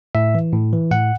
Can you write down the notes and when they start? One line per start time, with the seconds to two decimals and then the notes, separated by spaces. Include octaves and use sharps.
0.15 A2 E5
0.35 E3
0.53 A2
0.73 E3
0.91 A2 F#5